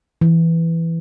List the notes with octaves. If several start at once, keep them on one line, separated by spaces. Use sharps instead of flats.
E3